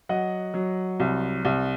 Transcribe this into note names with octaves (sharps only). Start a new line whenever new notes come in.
F#3 D#5 F#5
F#3
C2
C2